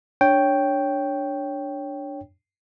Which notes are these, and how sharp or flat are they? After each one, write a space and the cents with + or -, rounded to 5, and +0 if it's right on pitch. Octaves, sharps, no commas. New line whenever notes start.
D4 +0 C#5 +0 G5 +0